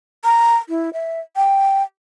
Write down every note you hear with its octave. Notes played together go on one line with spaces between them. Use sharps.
A#5
E4
E5
G5